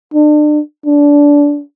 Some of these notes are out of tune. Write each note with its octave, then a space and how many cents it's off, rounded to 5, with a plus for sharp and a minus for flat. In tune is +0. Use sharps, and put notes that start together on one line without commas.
D4 +35
D4 -20